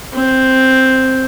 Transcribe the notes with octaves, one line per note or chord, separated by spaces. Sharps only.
C4